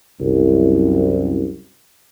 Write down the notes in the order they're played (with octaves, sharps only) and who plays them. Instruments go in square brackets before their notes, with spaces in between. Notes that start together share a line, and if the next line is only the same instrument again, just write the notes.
[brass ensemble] C2 F#2